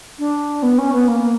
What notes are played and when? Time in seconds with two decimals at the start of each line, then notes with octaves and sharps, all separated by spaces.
0.18 D4
0.62 B3
0.78 C#4
0.93 B3
1.07 A#3